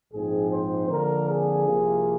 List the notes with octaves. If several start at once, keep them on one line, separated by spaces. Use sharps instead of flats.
A#1 G#2 F3 C4 G#4
C5
F2 D3 F3 A#3 A#4
G#4
C2 C3 F3 A#3